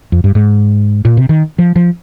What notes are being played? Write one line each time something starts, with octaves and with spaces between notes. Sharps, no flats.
F2
G2
G#2
A#2
C3
D#3
F3
F3